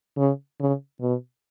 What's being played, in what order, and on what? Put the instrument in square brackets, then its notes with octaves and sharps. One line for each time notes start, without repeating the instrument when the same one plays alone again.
[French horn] C#3
C#3
B2